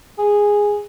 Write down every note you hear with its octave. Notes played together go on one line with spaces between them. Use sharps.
G#4